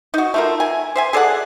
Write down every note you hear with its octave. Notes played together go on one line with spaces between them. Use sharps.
D#4 F#4
A3 F4 A#4
G#5
C5 E5 G#5
G#4 A4 D5 F#5